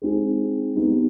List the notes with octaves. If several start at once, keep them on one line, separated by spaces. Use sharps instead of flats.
G#3 C4 D#4 G#4
G3 B3 D#4 G4